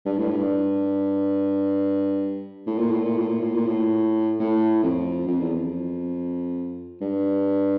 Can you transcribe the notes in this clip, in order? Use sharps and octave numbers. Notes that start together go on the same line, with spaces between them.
G2
A2
G2
A2
A#2
A2
A#2
A2
A#2
A2
A#2
A2
A2
F2
F2
E2
F2
G2